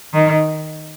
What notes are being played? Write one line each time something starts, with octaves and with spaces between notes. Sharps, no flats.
D#3